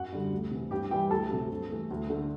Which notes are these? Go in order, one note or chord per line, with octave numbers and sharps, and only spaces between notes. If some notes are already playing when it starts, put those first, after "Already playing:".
Already playing: F#2 F#4 F#5
D3 G3
D2
C3 E3
G2 G4 G5
E3 G3 G4 G5
D2 A4 A5
C3 F#3 A3
G2
E3 A3
D2
D3 A3